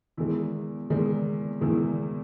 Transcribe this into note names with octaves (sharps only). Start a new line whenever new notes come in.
E2 D#3 G#3 E4
E2 D#3 G#3
E2 D#3 G#3 E4